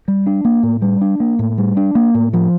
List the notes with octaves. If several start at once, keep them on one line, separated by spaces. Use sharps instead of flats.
G3
D4
A#3
A2
G3
D4
A#3
A2
G3
D4
A#3
A2
F3